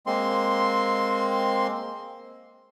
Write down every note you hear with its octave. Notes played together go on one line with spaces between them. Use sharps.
G#3 A#3 C4 C6